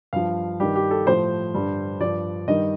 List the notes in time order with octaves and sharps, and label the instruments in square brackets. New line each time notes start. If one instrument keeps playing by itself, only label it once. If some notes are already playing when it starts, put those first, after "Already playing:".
[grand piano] G2 F3 F5
G2 D#3 G3 G4
G4
A4
A2 F3 C5
G2 D3 G3
G2 F3 D5
G2 D#3 G3 D#5